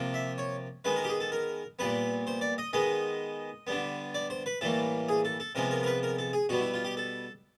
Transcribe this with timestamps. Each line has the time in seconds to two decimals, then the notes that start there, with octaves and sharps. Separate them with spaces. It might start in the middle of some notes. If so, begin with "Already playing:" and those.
Already playing: C3 F3 A#3
0.14 E5
0.38 C#5
0.85 D#3 G#3 B3 B4
0.96 A#4
1.04 G4
1.09 G#4
1.20 A4
1.32 A#4
1.79 A#2 G3 B3 B4
2.27 C5
2.41 D5
2.58 D#5
2.73 D#3 G#3 B3 D#5
3.67 D3 G3 B3
4.14 D5
4.30 C5
4.46 B4
4.61 A2 E3 G3 A#3 A4
5.09 G#4
5.25 A4
5.40 A4
5.55 C3 F3 G#3 B3 A#4
5.71 A#4
5.83 A#4
5.86 B4
6.03 A#4
6.19 A4
6.33 G#4
6.49 B2 G3 B3 F#4
6.61 E4
6.74 F4
6.85 G4
6.97 A4